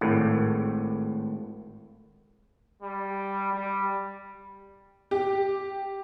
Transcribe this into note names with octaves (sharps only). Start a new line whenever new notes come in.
G#1 A2
G3
G3
G4